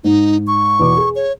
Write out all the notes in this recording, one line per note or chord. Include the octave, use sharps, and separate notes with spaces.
G#2 D#4
C#6
E2 B2 D6
G#4
C#5